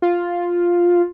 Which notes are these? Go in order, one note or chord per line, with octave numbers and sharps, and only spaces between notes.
F4